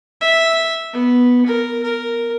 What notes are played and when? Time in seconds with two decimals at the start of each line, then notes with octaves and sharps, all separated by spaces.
0.21 E5
0.94 B3
1.46 A#4
1.84 A#4